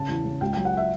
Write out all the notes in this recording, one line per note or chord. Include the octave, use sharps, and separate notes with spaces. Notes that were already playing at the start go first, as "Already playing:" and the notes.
Already playing: C#3 A5
E2
C#3
C#2 G5
G5
F#3
F#5
E5